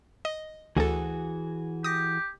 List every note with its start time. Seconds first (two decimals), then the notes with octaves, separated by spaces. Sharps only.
0.25 D#5
0.77 D2 E3 F#4 G#4 A4
1.84 G4 D#6 A#6